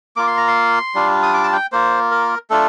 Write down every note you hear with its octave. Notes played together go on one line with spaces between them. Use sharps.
A#3 F4 D6
C6
A#5
C6
G3 D4 F4
D#6
D6
A5
G5
A#3 F4 C5
A#4
A3 D4 F4 A4